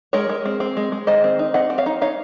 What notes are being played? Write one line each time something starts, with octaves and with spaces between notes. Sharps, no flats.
G#3 A#4 C#5
G#3
C4
C4
G#3
G#3
D#3 C5 D#5
C4
D#4
C4 D#5 F#5
C4
C#5 F5
D#4
D#4 C#5 F5